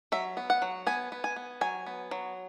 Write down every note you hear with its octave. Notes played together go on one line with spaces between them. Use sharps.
F#3 E5
B3
F#5
F#3
B3 G#5
B3
G#5
B3
F#3 G#5
B3
F#3